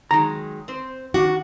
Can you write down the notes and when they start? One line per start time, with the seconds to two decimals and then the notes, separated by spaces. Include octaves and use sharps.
0.11 D#3 F#3 G#3 A#5
0.68 C4 C5
1.14 D#3 D4 F#4